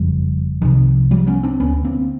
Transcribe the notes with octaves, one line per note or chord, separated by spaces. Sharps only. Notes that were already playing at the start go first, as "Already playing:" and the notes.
Already playing: F#1 F2 C#3 F3 G3
C2 C3 D#3 F3
F3 G3
B3 C#4
C4 D4
D2 D3 B3 C#4
A#3 C4